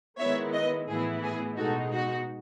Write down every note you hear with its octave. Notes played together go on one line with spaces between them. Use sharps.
D#3 G#3 B3 E4 C#5 E5
B4 D#5
A2 E3 B3 E4 G#4
G#4
B2 G#3 D#4 F#4 A4
F#4